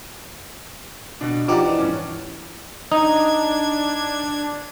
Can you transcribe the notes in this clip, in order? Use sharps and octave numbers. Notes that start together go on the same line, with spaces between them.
B2 D4
F3 D#4 G4 D5 F#5 D6
E3
G2 C#4
D4 D#4 G#6